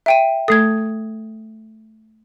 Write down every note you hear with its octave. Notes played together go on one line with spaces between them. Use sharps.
E5 G5 D#7
A3 A4 D#6 G#6